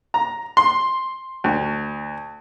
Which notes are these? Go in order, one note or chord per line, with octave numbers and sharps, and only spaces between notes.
A#5
C6
D2